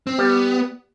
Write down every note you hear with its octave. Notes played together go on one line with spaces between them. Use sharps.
C4
G3 B3